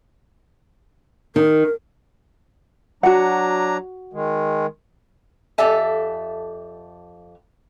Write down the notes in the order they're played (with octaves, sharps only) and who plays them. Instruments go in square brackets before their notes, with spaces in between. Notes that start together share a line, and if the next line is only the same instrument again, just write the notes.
[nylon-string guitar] D#3 [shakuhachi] A#4
[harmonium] F#3 D4 A#5 [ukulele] F#4 F#5
[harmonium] D#3 G#3
[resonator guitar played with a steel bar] F2 G4 A4 D5 E5 G#5